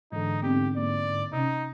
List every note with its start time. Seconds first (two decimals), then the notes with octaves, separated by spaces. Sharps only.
0.12 G#2 D3 E3 D#4
0.42 B3 C4 G4
0.76 A#3 D5
1.33 C3 C#4 D#4